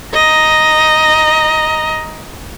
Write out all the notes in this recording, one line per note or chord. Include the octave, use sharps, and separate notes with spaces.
D#5 A#5